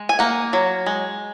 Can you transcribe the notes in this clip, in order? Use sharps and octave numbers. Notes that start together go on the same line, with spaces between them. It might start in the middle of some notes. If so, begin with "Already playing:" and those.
Already playing: G#3
G#5
A#3 F#5
F#3
G#3